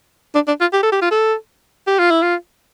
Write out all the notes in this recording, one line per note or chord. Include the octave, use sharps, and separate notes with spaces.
D4
D4
F4
G4
A4
G4
F4
A4
G4
F4
E4
F4